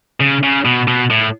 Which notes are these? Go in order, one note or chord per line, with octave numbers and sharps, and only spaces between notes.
C#3
C#3
B2
B2
A2